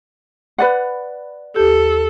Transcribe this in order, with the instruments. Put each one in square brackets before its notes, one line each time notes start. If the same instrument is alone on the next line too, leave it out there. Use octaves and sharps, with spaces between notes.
[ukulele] B4 D5 F#5
[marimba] D#2 G4 [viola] A4